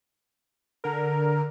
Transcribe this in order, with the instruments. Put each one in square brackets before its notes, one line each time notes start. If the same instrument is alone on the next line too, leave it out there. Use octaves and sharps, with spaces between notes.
[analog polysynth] D3 A#4